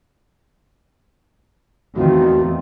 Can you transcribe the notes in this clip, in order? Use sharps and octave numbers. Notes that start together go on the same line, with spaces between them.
E2 D#3 F3 A3 C4 F4 F#4